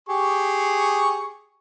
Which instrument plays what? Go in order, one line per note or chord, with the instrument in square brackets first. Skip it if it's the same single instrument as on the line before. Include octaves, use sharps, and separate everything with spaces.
[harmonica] G4 G#4 C#6